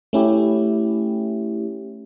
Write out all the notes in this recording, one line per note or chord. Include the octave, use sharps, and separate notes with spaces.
A3 C#4 E4 G4